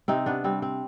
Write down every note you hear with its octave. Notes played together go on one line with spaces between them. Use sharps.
C3 C4 D#4
B3 D4
G3 C4
C4